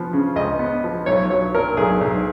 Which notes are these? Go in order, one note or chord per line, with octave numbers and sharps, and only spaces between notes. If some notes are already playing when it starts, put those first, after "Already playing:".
Already playing: F3 B3
C#3
C#2 D#5
B3
F3
B1 C#5
F#3 C#5
A#2 A#4
B1 G#4
B1